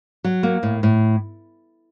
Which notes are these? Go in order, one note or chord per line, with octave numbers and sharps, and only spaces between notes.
F#3
A#3
A2
A2